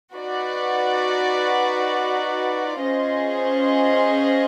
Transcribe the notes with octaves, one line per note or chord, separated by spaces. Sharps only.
D#4 F#4 B4 D5
C#4 F4 G#4 C5 D#5